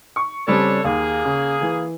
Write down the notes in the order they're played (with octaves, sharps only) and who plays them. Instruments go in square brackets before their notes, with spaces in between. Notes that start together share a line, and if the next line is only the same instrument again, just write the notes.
[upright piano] C#6
[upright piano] C#3 G3 C4 [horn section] D4 A4 C#5
[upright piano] D#2 [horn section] A#3 G#4
[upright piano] C#3
E3